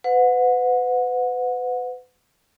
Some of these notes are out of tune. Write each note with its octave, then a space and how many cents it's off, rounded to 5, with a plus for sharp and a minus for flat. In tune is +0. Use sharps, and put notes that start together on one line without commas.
B4 +35 F#5 -30